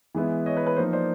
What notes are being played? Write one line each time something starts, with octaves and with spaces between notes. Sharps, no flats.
E3 G#3 B3 E4
C#5 D#5
B4 C#5
B4
F3 A#3 D#4 C5
C5 D5